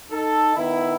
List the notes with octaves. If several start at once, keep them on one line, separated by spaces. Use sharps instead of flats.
D#4 A4
D#3 B3 E4